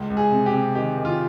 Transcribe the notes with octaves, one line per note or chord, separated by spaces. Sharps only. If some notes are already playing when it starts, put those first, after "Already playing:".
Already playing: C#2
C#2
G#4
C3
G4
C3
D#3 G4
D#3
F4